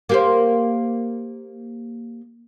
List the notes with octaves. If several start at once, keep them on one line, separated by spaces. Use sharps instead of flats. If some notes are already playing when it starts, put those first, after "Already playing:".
A#3 G4 C5